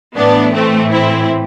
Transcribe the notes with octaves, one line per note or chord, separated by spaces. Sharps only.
A2 E3 B3 D4
A3 C4
C4 E4